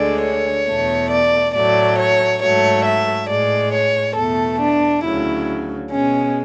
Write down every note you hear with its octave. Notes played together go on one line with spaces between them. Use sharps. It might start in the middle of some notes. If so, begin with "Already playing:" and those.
Already playing: D2 D3 G#3 D5
C#5
E2 B2 A3
D5
A2 F#3 A3 D5
C#5
G#2 F#3 A3 C#5
E5
A2 G#3 D5
C#5
E2 B2 A3 A4
D4
D2 C#3 F#3 E4
B2 G#3 C#4